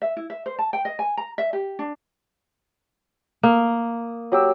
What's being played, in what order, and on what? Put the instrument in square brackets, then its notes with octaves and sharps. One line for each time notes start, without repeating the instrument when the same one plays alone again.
[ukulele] E5
E4
E5
C5
A5
G5
D#5
G#5
A#5
E5
G4
D4
[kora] A#3 [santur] D#6
[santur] F#3 G4 E6